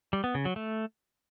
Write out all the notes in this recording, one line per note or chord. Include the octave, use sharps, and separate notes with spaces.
G3
B3
C#3
F#3
A3